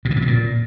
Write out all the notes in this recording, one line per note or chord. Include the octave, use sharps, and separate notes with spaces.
A#2
C3
G#2
C3
A#2